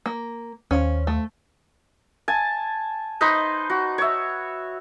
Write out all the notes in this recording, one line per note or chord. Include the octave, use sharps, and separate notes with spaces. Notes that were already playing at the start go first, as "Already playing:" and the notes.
A#3
D#2 C#4 C5 F5
A3
G#5 A5
D#4 B4 C5 D#5
F#4
C#5 E5